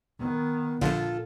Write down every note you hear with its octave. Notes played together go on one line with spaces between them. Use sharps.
D#3 B3
A#1 A#2 D3 F3 F4 A4